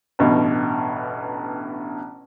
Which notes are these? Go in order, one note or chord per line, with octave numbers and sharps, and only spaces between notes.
A1 G2 B2